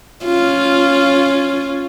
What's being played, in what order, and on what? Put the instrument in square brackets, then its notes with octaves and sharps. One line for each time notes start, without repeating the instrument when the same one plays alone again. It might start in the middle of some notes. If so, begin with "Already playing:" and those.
[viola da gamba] C#4 F4